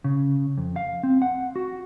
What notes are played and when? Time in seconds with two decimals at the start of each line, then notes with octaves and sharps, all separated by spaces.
0.04 C#3
0.57 F2
0.76 F5
1.03 C4
1.22 F#5
1.56 F#4